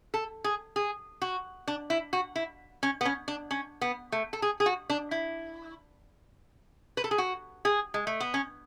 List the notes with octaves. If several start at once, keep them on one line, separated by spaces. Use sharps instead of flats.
A4
G#4
G#4
F#4
D4
E4
F#4
E4
C#4
B3
C#4
D4
C#4
B3
A3
A4
G#4
G#4
F#4
D4
E4
B4
A4
G#4
F#4
G#4
G#3
A3
B3
C#4